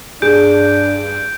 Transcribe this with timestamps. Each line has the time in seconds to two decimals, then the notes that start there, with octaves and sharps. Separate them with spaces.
0.22 G2 D4 G#4 G6 D7